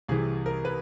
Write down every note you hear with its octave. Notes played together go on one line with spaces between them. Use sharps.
C2 C3 E3 G#4
A#4
B4